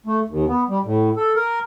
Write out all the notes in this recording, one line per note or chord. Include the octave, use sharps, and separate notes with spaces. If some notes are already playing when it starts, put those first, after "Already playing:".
A3
D#2
B3
G3
A2
A4
A#4